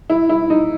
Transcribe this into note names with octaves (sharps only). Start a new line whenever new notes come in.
E4
E4
D#4